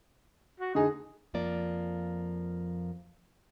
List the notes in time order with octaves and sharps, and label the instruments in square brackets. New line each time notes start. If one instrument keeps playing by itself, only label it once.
[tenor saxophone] F#4
[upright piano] D3 G#4 [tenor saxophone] D#4
[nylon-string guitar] F2 F3 A#3 D5